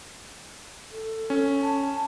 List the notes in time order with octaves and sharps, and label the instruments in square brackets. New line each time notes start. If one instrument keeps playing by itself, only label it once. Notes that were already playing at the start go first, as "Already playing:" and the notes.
[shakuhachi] A4
[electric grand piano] C#4
[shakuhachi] A5